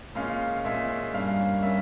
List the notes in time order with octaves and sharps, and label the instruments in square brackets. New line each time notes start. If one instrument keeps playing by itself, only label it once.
[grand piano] A#2 G#3 C#4 F5
A#2 G#3 C#4 E5
G2 G3 A#3 C#4 F5
G3 A#3 C#4 E5